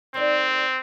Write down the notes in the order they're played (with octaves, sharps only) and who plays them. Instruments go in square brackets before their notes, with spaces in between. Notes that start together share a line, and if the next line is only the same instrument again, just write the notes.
[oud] D#3 A3 D5 [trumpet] C4